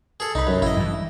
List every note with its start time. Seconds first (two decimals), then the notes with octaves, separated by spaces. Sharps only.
0.20 G#4 A4
0.35 C2 D#4 B5
0.47 F#2
0.62 A1 E4 D#5
0.76 G2 E3